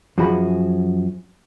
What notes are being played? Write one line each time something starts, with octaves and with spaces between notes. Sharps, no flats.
F#2 F3 F#4 G#4 B5